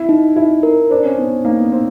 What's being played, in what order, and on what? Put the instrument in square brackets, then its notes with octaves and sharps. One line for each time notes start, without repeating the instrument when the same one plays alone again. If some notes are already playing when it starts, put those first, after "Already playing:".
Already playing: [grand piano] E4
[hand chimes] D#4
[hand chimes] D#4 [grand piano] E4
[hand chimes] A#4
[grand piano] D4 [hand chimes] C5
[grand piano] C#4
[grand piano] B3 [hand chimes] D#4
[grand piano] A#3 [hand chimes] D#4
[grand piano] B3
[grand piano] C4 [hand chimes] D#4